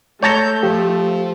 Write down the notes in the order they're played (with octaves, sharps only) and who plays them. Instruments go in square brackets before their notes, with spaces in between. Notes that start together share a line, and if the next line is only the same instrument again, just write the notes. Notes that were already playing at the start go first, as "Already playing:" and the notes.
[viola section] A3 [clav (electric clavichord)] C#5 A5 A#5 [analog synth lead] G6
[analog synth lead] F3 [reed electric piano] G4